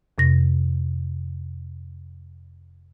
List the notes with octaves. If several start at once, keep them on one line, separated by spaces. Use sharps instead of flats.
F2 C3 A#6